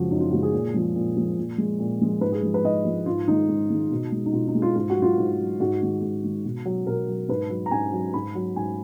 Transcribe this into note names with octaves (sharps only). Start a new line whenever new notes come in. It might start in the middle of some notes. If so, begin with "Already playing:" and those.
Already playing: F#2 C#3 F3 G#3 F#4
F#2 D#4
F4
C#3 F3 G#3 F#4
G#4
A#2
F3 G#3
A#2
F3 G#3
A#2
F3 G#3
A#2
F3 G#3
G#2 B4
G#4
F3 G#3
B4
G#2 D#5
F3 G#3
G#2 F4
D#3 G#3 D#4
G#2
D#3 G#3
B2
G#3
D#4
B2 F4
D#4
G#3
F4
G#2 F4
F#4
F#3
F4
G#2
F#3
G#2 F#4
D#3 G#3
G#2
D#3 G#3
B2
F#3
B2 A#4
F#3
G#2 B4
F#3
A#5
G#2 G#5
F#3
G#2 B5
F#3
G#2 G#5